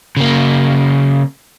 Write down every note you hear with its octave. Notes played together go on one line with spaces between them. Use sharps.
C#3 A#3